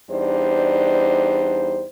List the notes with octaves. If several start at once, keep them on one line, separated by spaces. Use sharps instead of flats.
E2 G3 D4 D#4 C5